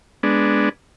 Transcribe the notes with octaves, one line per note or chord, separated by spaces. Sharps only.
G#3 B3 D4